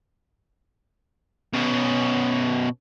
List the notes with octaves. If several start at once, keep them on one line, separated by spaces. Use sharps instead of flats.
B2 C#4